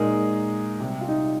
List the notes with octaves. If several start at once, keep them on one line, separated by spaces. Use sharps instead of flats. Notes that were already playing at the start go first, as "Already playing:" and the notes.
Already playing: A#2 G#3 D#4 G#4 A#4
C3 G3
F4
D#4